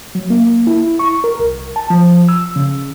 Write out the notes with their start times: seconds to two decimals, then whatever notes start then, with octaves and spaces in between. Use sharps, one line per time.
0.15 F#3
0.30 A#3
0.67 E4
0.99 C#6
1.24 A#4
1.39 C2
1.76 A5
1.90 F3
2.29 E6
2.56 C#3